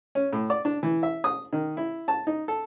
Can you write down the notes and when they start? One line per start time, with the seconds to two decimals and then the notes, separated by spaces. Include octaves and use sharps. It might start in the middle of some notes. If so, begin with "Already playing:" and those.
0.15 C#4
0.33 A2
0.50 D5
0.65 D4
0.83 E3
1.03 E5
1.24 D#6
1.53 D#3
1.77 E4
2.08 A5
2.27 D#4
2.48 A4